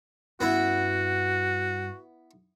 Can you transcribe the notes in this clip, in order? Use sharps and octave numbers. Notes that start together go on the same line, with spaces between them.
G2 B3 C#4 E4 F#4